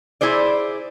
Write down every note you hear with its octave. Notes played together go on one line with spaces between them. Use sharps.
E4 G#4 C5 D5